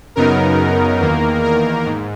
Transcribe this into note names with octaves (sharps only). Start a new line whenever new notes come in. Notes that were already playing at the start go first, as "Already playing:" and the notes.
F#2 C#3 F#3 B3 D#4 A#4
E2 D#3 A#3
A#4
G#2